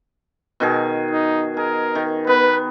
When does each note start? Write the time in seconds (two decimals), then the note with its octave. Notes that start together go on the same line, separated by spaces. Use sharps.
0.60 B2 D#3 G#4
1.11 D#4
1.57 G#4 A#4
1.95 D#3
2.27 B3 B4